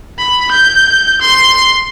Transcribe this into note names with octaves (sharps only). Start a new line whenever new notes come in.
B5
G6
C6